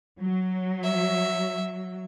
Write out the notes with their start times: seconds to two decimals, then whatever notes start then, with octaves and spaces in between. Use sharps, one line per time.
0.20 F#3
0.83 E5